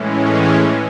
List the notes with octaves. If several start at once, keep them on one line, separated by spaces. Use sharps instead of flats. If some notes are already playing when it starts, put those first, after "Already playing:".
Already playing: A2 E3 G#3 C#4